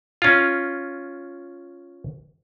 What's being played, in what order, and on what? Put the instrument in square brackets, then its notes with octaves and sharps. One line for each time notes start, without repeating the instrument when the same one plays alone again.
[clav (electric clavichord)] C#4 F4